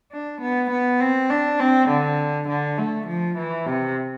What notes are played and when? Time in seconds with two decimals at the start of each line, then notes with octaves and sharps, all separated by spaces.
0.12 D4
0.41 B3
0.71 B3
1.01 C4
1.30 D4
1.60 C4
1.89 D3
2.49 D3
2.78 A3
3.07 F3
3.38 E3
3.66 C3